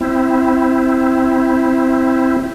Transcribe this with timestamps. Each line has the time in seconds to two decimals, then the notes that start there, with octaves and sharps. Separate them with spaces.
0.01 C4 E4